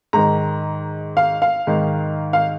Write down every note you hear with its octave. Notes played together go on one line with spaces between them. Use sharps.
G#2 D#3 A#5
F5
F5
G#2 D#3
F5